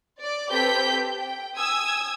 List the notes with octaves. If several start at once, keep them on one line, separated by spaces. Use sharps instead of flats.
D5
C4 G4 A4 B4 G6 B6
G5
G#5 D#6 E6 G#6